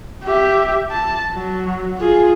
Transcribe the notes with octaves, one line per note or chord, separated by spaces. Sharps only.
G4 E5
A5
F#3
F4 G#4